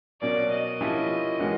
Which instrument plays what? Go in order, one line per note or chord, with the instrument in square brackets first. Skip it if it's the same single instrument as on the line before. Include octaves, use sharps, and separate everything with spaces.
[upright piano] B2 F#3 A#3 C#4 [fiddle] D5
[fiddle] D#5
[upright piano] F3 A#3 C#4 E4 G4
E3 G#3 C#4 F#4 A#4